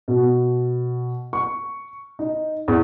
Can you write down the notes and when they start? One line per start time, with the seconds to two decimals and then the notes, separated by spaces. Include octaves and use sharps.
0.08 B2
1.33 C#6
2.19 D#4
2.68 E2